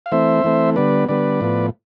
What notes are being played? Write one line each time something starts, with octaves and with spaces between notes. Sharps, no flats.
F5
E3 A3 C4 C5 E5
E3 A3 C4
D3 G3 B3 B4 D5
D3 G3 B3 B4 D5
A2 F3 B3